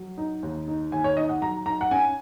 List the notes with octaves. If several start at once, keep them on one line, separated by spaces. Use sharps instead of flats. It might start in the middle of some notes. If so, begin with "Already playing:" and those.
Already playing: F#3
D#4
D#2
D#4
D#2 G#5
C#5
D#4 D#5
F#5
F#3 A#5
D#4 A#5
F#5
C#4 G#5